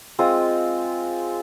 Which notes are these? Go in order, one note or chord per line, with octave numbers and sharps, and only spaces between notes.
G#3 C4 F4 D#6